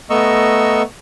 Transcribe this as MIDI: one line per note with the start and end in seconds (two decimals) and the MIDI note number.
0.10 0.82 57
0.10 0.82 59
0.10 0.82 75
0.10 0.82 82
0.10 0.82 85
0.10 0.82 88